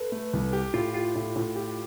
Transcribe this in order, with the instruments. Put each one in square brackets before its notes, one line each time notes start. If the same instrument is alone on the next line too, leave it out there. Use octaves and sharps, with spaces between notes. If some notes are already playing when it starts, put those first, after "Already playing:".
Already playing: [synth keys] A4 B4
[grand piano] A3
C2
G4
[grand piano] A2 [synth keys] F4
[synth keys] F4 [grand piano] G4
[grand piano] A2
A2
G4